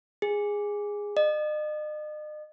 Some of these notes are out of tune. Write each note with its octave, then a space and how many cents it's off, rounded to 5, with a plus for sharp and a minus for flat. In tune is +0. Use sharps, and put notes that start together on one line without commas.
G#4 -10
D#5 -40